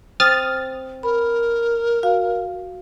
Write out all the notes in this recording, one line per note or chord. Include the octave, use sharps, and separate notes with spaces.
C4 D#6 F6 A6
A#4 B5
F#4 F5